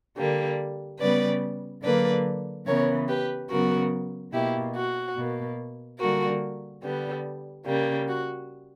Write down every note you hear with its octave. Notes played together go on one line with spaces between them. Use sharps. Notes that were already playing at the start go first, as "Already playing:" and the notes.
D3 G3 A#3
C#3 G3 B3 B4 D5
D3 F#3 A#3 B4 D5
C#3 E3 B3 A#4 C#5
G4 B4
C#3 F#3 B3 F#4 A#4
B2 A#3 E4 G4
F#4
B2 A#3
D3 G3 A#3 F#4 A#4
D3 G3 B3
C#3 G3 A#3
F#4